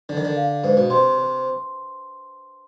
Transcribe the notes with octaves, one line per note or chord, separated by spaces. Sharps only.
D3 D4
D#3
D3
F5
G#2 B4
B2
C3 C6
C5